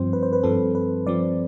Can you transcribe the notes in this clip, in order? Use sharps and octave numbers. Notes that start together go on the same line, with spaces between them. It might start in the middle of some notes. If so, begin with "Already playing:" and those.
Already playing: G2 F3 C4 C5
B4
C5
B4
G2 F3 C4 A4
B4
G2 F3 C4 D5